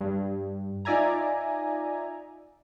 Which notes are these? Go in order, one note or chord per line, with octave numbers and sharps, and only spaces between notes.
G2
D#4 F4 D5 E5 G#5 A#5